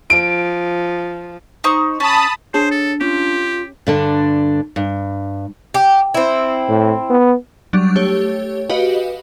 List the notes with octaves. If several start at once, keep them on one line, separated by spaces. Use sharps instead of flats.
F3 D7
D#4 C5 C#6
C#4 A5 B5 D#6
D4 G#4 C5 C#5 A5
A4
C#4 F4 G4
G2 D3 D4
G2
G4
C4 E4
A2
B3
F#3 G3 D4
A3 G4 C#5
F#4 G4 B4 D#5 F5